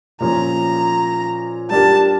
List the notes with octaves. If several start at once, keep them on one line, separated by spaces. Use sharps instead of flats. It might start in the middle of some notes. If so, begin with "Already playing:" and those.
A#2 F3 C#4 A#5
G3 D4 G4 A#4 A5